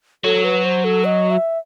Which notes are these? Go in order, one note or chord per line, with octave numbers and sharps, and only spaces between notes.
F#3 A4
B4
C5
A4
D#5
E5